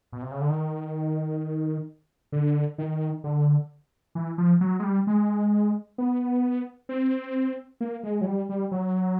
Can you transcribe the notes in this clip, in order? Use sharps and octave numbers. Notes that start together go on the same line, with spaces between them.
B2
C3
C#3
D3
D#3
D3
D#3
D3
E3
F3
F#3
G#3
G3
G#3
B3
C4
A#3
G#3
F#3
G3
G3
F#3